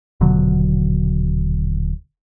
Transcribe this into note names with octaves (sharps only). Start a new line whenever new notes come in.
D#1 B2 D3 F#3